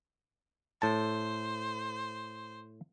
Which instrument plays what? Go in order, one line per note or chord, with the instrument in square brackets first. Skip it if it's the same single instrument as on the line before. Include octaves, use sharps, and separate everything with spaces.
[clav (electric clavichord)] A2 A5 [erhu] C5